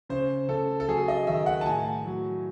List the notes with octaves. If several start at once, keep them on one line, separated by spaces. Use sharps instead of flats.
C#3 C5
C#3 A4
A4
F#3 G#4
D#5
D#3 E5
F#5
A5
A2 G#5
F#3